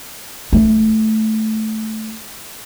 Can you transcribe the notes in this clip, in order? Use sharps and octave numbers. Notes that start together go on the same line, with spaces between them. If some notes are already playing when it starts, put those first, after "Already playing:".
A3 E4